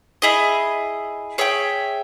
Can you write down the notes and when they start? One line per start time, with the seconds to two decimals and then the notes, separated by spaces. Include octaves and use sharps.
0.22 E4 G#4 D#5
1.38 G#4 C#5 E5 G5